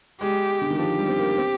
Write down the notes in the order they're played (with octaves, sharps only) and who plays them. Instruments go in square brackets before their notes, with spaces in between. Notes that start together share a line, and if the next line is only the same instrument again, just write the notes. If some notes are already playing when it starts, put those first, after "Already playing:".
[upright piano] G#3 [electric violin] G4
[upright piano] D3
D#3
[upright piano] F3 [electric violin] G4
[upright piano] G3
C4
A#3
C4